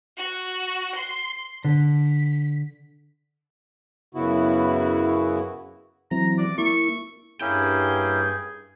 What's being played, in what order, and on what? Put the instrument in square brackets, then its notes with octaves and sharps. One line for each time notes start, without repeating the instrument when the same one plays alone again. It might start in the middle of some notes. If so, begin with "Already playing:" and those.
[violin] F#4
C6
[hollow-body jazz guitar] D3 [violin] B6
[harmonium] F#2 C#3 B3 E4 F#4
[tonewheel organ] E3 F#3 C4 [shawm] A#5
[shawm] D5
[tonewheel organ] A#3 E4 [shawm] C#6
[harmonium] G2 [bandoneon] A#3 C#4 E4 [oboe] G#4 [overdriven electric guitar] G5